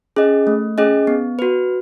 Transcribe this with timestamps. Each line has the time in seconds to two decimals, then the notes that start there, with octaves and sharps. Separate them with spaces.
0.16 C#4 G#4 D#5
0.47 A3
0.78 C#4 G#4 D#5
1.07 B3
1.39 F#4 B4